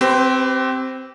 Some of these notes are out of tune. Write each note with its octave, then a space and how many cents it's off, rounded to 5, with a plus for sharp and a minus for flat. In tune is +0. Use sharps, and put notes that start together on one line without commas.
C4 +0 G4 -20 B4 +30